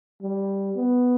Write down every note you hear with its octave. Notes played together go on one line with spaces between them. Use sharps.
G3
B3